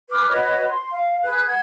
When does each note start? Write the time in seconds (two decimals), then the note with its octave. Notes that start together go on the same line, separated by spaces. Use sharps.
0.10 G#4 B4 D6 F6
0.28 F#4 B4 C#5 D#5
0.68 C6
0.90 F5
1.23 G#4 B4 F#6
1.45 F#5 G#6